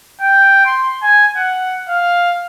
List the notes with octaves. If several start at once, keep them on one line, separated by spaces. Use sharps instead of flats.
G5
C6
G#5
F#5
F5